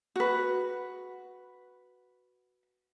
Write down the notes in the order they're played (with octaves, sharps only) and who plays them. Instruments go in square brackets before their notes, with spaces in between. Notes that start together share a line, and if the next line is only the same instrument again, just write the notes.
[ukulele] F#4 B4